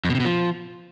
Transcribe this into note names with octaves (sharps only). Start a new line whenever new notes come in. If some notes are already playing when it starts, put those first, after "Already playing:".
F2
B2
C3
B2
F3